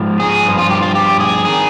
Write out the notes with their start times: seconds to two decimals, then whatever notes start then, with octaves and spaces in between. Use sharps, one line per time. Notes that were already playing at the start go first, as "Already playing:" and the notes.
Already playing: G#2 F3
0.20 G#4
0.45 G2 F3
0.58 F4
0.70 G4
0.82 F4
0.95 G4
1.20 G#4
1.45 D#3 G#4